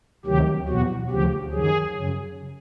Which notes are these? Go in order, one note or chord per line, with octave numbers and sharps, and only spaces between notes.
D2 C3 D#3 F#3 G4
E2 B2 F#3 F#4
D2 C#3 F3 G4
F#2 D#3 F#3 G#4
F#2 C#3 F#3